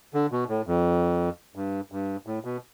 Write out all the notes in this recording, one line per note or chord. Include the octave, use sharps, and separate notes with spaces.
D3
B2
A2
F2
G2
G2
A2
B2